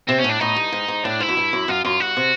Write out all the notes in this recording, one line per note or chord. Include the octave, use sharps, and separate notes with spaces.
C3 C4
C#4
A2
D4
A2 D#4
G2
G#2
G#2
A2 D4
G#2 E4
F#2
G2
F#2
F#2 F4
F#2 F4
G2 F#4
C3